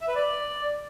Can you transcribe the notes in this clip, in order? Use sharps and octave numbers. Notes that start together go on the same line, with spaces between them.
E5
B4
D5